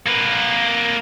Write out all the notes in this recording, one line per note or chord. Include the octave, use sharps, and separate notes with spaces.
A#3 B4